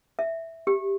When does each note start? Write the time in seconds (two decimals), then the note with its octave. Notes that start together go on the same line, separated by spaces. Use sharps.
0.19 E5
0.67 G4